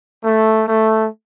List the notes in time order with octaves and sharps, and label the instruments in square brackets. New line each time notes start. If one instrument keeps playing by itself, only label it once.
[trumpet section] A3
A3